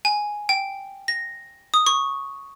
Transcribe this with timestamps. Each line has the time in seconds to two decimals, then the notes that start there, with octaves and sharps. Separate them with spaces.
0.05 G#5
0.49 G5
1.08 A#6
1.74 D#6
1.86 C#6